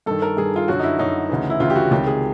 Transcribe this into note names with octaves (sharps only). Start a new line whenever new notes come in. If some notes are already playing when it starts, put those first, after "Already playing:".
G2 D#3 A4
A#4
G2 D#3 G#4
F4
F#2 D3 F#4
D#4
E4
F#2 D3 D#4
D2 C#3 E3
E4
D2 C#3 E3 F4
G4
F#4
C#2 C3 D#3 G4
G#4